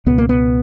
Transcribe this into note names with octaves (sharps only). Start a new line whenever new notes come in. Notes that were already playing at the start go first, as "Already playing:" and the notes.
C#2 B2 B3
A#3
B3